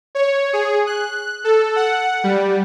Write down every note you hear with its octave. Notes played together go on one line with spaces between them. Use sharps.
C#5
G#4
F#6
A4
F#5
G3